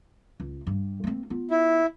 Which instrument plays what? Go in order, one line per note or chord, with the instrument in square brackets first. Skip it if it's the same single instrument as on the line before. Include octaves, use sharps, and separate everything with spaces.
[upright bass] C#2
G2
A#3 C4
B3 F4
[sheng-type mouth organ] E4